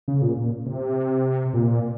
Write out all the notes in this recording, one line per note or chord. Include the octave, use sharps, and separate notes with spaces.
C#3
A#2
A#2
C3
A#2